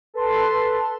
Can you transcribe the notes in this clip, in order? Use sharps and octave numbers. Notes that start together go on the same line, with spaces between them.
A4 B4 A5 C6